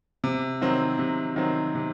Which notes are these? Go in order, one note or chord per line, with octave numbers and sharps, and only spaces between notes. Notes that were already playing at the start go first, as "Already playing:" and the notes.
C3
D#3 F#3 C4
C3
D#3 F#3 C4
C3